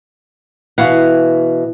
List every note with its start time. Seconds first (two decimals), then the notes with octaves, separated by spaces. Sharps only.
0.78 B2 E3 F5 F#5